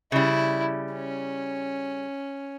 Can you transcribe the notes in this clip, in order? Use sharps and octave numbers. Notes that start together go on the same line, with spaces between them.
C#3 G3 E4
C#4